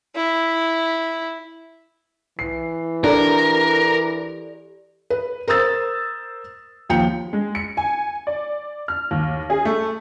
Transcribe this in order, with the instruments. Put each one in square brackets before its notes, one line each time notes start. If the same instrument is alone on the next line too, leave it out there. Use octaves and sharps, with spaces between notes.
[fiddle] E4
[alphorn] E3 [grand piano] C7
[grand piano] D4 [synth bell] G4 A4 D5 [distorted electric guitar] A#4
[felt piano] B4
A#4 C5 D#6 E6 A6
D#2 F3 G5 C#7
[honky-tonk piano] G#3
C#7
G#5
D5
F6
D#2
G#4
A3